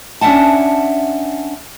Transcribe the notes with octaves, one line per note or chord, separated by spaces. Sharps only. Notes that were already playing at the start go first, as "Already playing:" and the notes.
C#4 D4 E5 F#5 A5